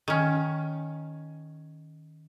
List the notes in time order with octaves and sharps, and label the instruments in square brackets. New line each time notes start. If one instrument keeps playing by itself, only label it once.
[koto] D#3 C#4